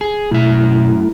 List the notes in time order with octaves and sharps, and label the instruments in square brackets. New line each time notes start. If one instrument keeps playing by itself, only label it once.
[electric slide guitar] G#4
[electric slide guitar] F#2 E5 [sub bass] B2 [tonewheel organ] A3 E4